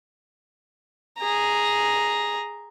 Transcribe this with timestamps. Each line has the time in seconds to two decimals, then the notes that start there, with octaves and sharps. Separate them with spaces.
1.19 G#4 A#5